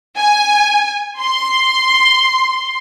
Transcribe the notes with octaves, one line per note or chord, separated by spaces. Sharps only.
G#5
C6